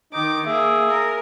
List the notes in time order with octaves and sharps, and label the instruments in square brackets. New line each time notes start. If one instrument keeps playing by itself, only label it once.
[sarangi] D#3 [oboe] D#4 [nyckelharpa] D6
[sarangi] A#3 [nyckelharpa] G#4 [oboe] E5
[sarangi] A#4